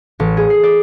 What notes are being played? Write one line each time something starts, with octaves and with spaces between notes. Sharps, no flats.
A1
G#4
C7
D5